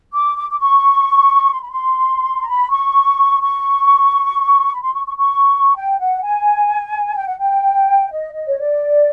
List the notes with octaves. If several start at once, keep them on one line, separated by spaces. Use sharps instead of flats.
D6
D6
D6
C#6
C6
B5
C6
A#5
B5
C#6
C#6
B5
C6
C#6
C#6
C#6
G5
F#5
G#5
G5
F#5
G5
D#5
D#5
C#5
D5